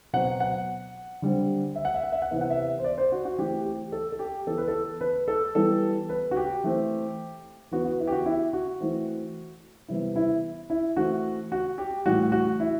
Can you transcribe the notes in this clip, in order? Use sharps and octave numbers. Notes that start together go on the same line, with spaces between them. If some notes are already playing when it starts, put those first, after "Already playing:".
B2 F#3 C4 F#5
F#5
D3 G3 C4
E5
F#5
E5
F#5
E5
F#5
C3 E3 B3 E5
F#5
E5
C5
D5
C5
F#4
F#4
E3 A3 C4 G4
G4
A4
A4
G4
E3 B3 A4
B4
A4
B4
A4
E3 G3 B3 A4
B4
F#4
G4
E3 A3 C4
E3 B3 F#4
F#4
E4
G4
F#4
E4
F#4
E3 A3 C4
C3 E3 G3 B3 E4
E4
E4
E3 A3 C4 F#4
F#4
G4
A2 E3 G3 F#4
F#4
E4